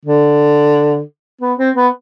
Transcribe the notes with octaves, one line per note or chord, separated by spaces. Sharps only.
D3
B3
C4
B3